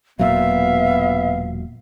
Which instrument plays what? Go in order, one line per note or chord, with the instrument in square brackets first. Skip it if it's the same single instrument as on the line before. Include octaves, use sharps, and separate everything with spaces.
[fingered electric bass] E1 A#2 F#3 [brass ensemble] B3 [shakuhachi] E5 [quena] F5